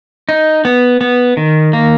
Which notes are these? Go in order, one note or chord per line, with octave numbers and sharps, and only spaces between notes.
D#4
B3
B3
D#3
A#3